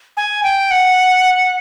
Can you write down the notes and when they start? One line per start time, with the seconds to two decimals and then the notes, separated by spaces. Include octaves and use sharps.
0.17 G#5
0.44 G5
0.71 F#5